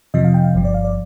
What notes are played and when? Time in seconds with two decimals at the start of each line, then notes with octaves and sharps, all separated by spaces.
0.14 F2 C3 F3 D#5
0.24 F5
0.34 G5
0.44 F5
0.54 G1 G2 F3
0.65 D5
0.74 F5
0.84 D5